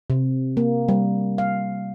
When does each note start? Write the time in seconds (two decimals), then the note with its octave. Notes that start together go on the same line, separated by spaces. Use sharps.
0.10 C3
0.57 A#3
0.89 G3
1.38 F5